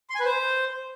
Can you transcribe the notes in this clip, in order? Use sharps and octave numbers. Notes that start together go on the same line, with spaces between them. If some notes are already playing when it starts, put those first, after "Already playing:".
C6
G#5
B4
C5